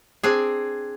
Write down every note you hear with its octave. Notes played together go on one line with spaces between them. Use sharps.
C4 D4 G#4